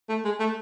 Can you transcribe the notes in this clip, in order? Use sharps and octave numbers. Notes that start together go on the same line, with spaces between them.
A3
G#3
A3